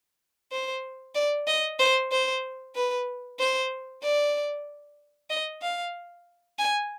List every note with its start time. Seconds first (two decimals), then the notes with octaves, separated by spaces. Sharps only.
0.52 C5
1.15 D5
1.47 D#5
1.79 C5
2.12 C5
2.75 B4
3.39 C5
4.03 D5
5.30 D#5
5.62 F5
6.59 G#5